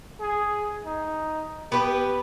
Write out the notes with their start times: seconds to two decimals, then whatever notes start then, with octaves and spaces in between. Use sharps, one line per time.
0.20 G#4
0.85 D#4
1.72 B3 G4 B4